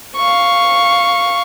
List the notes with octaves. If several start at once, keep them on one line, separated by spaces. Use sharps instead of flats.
F5 C#6